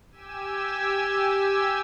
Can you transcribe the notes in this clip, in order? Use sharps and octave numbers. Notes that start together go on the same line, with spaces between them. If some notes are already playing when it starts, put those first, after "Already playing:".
G4 G#5 E6